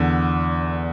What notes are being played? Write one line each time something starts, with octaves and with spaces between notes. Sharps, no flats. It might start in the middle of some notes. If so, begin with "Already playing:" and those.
Already playing: E2 D3 D4